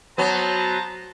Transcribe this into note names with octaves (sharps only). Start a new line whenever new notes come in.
F#3 B3 C5 A5 A#5